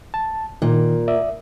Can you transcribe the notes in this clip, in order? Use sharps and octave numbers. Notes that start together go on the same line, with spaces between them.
A5
A#2 D#3
D5 E5